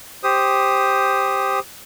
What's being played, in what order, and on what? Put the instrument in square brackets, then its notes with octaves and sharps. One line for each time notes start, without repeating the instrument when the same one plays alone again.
[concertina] G4 C5 D#6